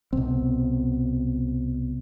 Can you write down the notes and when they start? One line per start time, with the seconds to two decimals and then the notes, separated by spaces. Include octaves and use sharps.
0.13 C2 B2 C4